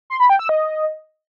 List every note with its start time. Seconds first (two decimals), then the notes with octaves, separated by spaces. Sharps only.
0.10 C6
0.20 B5
0.30 G5
0.39 E6
0.49 D#5